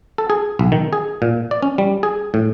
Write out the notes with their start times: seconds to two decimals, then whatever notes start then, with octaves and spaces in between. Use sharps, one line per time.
0.18 A4
0.30 G#4
0.59 B1
0.72 D#3
0.93 G#4
1.22 A#2
1.51 D5
1.62 C#4
1.78 G3
2.03 G#4
2.34 A2